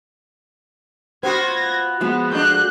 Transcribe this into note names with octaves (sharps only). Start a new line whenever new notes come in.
B3 F4 F#4 C5 G#6 A#6
F3 G#3 B3 F#4
A3 D4 F#6 G6